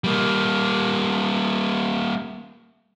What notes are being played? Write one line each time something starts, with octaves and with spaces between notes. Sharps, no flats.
G3 A#3